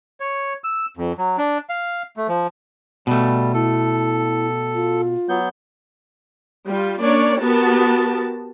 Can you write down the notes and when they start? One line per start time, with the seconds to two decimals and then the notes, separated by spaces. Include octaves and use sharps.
0.20 C#5
0.64 E6
0.97 F2
1.18 F#3
1.38 D4
1.69 F5
2.17 A3
2.28 F3
3.07 B2 G3 A3
3.54 E4 A4
4.75 F4
5.29 F#3 B3 G6
6.67 G3 F4
7.01 A#3 C#4 D4 C#5 D5
7.42 B3 F#4 G4 A#4 A5